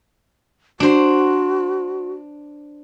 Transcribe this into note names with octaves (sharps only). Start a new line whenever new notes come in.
D4 F#4 C5